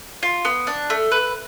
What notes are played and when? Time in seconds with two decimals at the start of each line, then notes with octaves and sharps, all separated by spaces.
0.23 F4
0.45 B3
0.67 D4
0.90 A3
1.12 B4